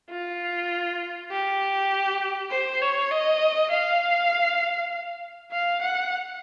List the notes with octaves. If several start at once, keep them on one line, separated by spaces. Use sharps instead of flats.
F4
G4
C5
C#5
D#5
F5
F5
F#5